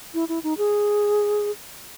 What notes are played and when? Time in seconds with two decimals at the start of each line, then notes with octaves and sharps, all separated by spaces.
0.14 E4
0.29 E4
0.44 D#4
0.58 G#4